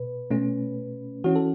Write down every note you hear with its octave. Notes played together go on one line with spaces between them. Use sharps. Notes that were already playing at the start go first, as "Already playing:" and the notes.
Already playing: B2 B4
B2 A3 C#4
E3 C#4 F#4
A4